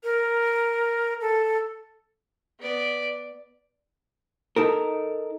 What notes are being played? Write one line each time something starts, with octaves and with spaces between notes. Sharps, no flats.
A#4
A4
B3 D5
D#4 A4 A#4